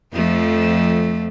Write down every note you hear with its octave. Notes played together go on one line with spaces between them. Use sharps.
F2 F3 A3